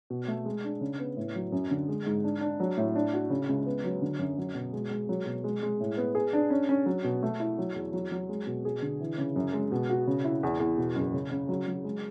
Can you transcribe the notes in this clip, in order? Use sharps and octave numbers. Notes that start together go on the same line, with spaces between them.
B2
A3
G#3
D4
C#3
B3
A2
F#3
F#2
D3
G#3
G#2
D4
D4
F#3
A2
D4
F#4
C#3
C#2
B3
F#3
D3
F#2
F#3
B2
G#3
G#3
F#3
B2
G#3
G#3
A2
B3
G#4
D4
C#4
C#4
F#3
B2
A3
E4
F#3
E2
F#3
F#3
G#3
B2
G#4
D3
E3
C#3
F#2
G#3
B2
F#4
C#3
E4
E2
E2
B2
F#1
C#3
C#3
F#3
F#3
G#3